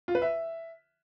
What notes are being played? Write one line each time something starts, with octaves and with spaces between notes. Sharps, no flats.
F4
B4
E5